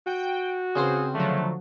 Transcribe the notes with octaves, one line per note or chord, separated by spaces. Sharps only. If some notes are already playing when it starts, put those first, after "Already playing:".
F#4 G5
C#3 C4 G#4 B4 C5
D3 F3 F#3 A3